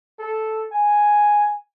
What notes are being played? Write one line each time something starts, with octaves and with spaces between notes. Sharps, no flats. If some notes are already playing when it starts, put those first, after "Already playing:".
A4
G#5